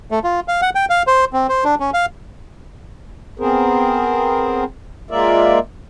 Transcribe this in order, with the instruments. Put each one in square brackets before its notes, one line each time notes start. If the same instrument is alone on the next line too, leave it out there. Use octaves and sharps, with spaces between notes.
[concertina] A3
F4
F5
F#5
G5
F5
C5
C4
C5
D4
C#4
F5
[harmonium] B3 C4 G#4 A#4 C5
G#3 A#3 F4 A#4 D5 E5